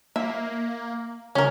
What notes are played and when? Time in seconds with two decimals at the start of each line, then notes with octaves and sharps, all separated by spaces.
0.16 A#3 E5
1.35 C#3 C#4 A#4